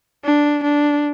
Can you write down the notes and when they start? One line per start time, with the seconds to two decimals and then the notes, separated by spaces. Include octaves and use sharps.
0.24 D4
0.63 D4